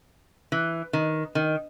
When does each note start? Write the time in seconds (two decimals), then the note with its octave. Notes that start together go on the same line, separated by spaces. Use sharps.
0.52 E3
0.93 D#3
1.35 D#3